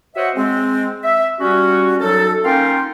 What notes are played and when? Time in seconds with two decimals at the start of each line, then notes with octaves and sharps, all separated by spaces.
0.16 F#4 C5 C#5 D#5 E5 F#5
0.36 G#3 C4
1.04 E5
1.41 G3 C#4 F#4
2.00 F#2 F#3 D#4 A4
2.45 A#3 C#4 D#4 F4 F5 G5